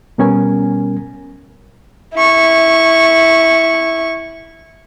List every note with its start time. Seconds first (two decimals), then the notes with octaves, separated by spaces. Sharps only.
0.18 B2 G3 B3 C#4 A#4 G#5
2.14 E4 C#6